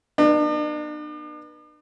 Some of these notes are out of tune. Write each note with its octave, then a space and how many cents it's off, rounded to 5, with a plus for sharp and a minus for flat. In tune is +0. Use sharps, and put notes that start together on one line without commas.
B3 -30 D4 +45